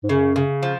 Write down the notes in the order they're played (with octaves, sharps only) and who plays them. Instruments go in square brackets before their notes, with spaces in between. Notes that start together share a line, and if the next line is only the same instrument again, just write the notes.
[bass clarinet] G#2
[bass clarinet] F#2 [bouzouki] C#3
[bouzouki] C#3
F3